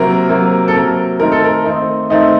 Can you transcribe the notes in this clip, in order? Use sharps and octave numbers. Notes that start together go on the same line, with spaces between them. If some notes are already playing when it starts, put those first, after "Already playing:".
Already playing: C3 F#3 A#3 A#4
C3 F#3 A#3
A4
C3 F#3 A#3 A#4
D#3 A3 C4 D#4 A#4
A4
A#4
D#3 A3 C4 D#4
D#3 A3 C4 D#4